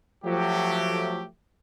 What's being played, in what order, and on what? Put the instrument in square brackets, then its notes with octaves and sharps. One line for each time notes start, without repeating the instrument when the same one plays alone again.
[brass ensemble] F3 F#3 A3 G4